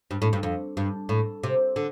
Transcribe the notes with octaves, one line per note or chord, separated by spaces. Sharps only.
G2
A2
G2
F2
G2
A2
C3
D3